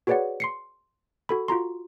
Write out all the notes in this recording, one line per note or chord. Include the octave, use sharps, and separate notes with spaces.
F#4 G#4 B4 C#5 D5 F#5
C6 C7 C#7
F#4 A4 B5
F4 F#4 A#5 C6